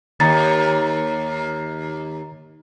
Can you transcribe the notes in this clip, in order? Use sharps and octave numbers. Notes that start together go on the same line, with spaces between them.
D#2 A#5 A6